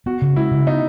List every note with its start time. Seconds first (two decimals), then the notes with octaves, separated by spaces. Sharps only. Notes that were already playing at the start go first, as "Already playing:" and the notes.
0.06 B3 F#4
0.22 C#3
0.36 G#3 E4
0.51 C#3
0.67 B3 D#4